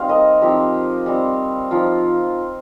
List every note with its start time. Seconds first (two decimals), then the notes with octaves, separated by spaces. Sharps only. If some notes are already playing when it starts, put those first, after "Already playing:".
Already playing: G3 C4 D#4 C5 F5
0.09 A#4 D#5
0.41 F3 C4 D#4 G4
1.06 G3 C4 D#4
1.71 F3 D#4 F4